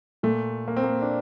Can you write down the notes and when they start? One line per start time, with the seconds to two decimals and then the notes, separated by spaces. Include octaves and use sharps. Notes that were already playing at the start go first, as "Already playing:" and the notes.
0.23 A#2 A3
0.68 A#3
0.77 C4
0.84 A#3
1.02 D4